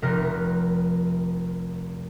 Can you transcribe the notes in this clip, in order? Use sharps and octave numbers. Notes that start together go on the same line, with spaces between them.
F1 C3 A#4 F#6